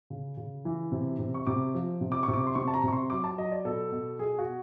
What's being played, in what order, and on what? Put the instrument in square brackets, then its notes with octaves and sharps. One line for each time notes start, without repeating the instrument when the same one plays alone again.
[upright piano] C#3
C#3
E3
C3
C3
C#6
C3 D6
F3
C3
D6
C#6
C3
D6
C6
C3 C#6
A5
A#5
C3 C#6
C6
F#3 D6
A5
F#3 D#5
D5
B2 A4
B2
B2 G#4
F#4